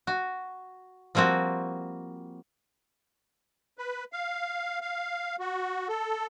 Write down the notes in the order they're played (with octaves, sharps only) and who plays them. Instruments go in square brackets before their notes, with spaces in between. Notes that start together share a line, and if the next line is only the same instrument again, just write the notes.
[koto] F#4
F3 G3 A#3 C4 F#4
[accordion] B4
F5
F5
F#4
A4